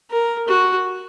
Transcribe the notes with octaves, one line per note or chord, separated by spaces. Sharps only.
A#4
F#4